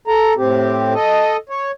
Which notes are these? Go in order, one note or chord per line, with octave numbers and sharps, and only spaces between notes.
A4 A#5
A2 C4 G4
A4 D#5
C#5